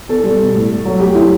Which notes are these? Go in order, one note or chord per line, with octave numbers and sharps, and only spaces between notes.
E2 A4
G3
B2
A2
A3
F#3
D2 G4
F#3 E4